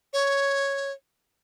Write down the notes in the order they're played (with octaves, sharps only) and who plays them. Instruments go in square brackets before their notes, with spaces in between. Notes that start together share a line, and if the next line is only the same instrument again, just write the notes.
[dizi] C#5